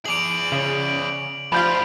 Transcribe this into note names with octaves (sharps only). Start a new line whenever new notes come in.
G#4 D5 D7 F7 F#7
C#3
D2 F3 G3 F4 B5 G6